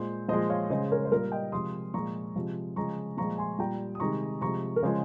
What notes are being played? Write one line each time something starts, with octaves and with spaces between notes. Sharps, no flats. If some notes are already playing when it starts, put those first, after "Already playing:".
Already playing: A#2 G#3 C5
A#2 F3 G#3 C5 D#5
C#5 F5
C#3 G#3 C5 D#5
A#4 C#5
C5
A#2 G3 A#4
D#5 G5
C3 F3 G#3 C6 D#6
A#2 F3 G#3 A#5 C#6
C3 F3 G#3
C#3 F3 G#3 A#5 C#6
A#2 F3 G#3 A#5 C#6
G#5 C6
A#2 G3 G5 A#5
D#6
C3 D#3 G#3 A#5 C#6
C3 F3 G#3 A#5 C#6
A#4
C#3 F3 G#3 G#4 C5